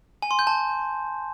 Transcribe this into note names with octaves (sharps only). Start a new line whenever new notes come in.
G#5
C6
G6
A5